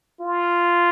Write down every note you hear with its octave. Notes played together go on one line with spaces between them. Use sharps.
F4